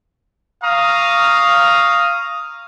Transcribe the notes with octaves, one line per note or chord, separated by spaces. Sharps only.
F5 A#5 C#6 D#6